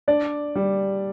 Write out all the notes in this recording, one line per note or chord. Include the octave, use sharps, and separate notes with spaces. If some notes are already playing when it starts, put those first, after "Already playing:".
D4 D5
G3